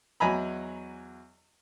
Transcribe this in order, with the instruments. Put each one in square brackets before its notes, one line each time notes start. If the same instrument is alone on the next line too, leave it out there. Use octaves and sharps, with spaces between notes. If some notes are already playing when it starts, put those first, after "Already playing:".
[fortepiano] E2 F#3 D#5 G#5 A#5 B5